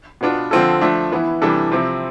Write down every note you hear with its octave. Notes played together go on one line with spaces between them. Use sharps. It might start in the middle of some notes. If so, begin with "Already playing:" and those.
B2 B3 D4 F4
D3 F3 C4 F4 A4
F3 A3 D4
E3 B3 E4
C3 E3 G3 D4 A4
C3 F3 C4 E4